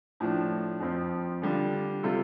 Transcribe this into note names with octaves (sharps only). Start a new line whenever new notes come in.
A2 F3 D4
F2 F3 C4
D3 G3 D4 F4
C3 G3 F4 A4